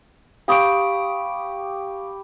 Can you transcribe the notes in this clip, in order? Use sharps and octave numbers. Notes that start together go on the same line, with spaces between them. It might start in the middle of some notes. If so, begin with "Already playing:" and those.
G4 F5 B5 C#6 D#6 D7